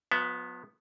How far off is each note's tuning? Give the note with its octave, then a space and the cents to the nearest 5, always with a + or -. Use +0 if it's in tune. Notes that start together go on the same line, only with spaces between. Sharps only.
F3 +45 B3 +0 E5 +0